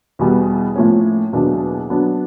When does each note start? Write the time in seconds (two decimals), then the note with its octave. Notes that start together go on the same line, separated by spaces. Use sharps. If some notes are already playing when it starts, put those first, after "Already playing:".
0.19 E2 B2 G3 B3
0.76 A2 F3 A#3 C#4
1.33 E2 B2 F#3 A#3 D4
1.90 F#3 B3 D4